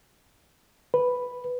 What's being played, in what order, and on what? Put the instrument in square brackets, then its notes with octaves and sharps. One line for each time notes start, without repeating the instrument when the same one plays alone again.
[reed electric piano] B4